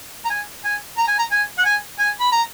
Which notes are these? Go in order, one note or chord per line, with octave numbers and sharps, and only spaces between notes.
A#5
G#5
G#5
A#5
G#5
A#5
G#5
F#5
G#5
G#5
B5
A#5